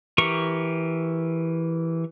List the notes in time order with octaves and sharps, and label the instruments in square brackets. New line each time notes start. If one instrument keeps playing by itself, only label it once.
[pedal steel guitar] E3 G4 A#4 C#6